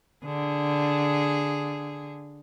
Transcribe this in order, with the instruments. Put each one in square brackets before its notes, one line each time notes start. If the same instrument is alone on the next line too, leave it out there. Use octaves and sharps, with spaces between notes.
[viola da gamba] D3 G#4